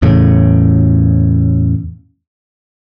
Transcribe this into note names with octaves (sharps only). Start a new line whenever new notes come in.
E2 A2 C#3